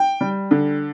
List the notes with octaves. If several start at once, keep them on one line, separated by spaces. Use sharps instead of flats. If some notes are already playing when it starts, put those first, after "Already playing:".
Already playing: G5
G3
D3